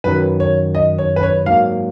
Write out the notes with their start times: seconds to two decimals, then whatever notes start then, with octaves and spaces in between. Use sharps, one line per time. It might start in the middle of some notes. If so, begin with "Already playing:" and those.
0.04 F#2 D#3 F#3 B4
0.40 C#5
0.75 D#5
0.98 C#5
1.16 B4
1.23 C#5
1.46 G#2 F#3 A#3 F5